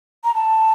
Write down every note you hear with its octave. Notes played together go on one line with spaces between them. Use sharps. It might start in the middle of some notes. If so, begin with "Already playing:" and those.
A#5
A5